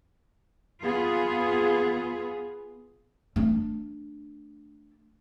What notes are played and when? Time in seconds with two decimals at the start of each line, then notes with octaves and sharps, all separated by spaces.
0.82 B3 F4 G#4
3.36 A3 D4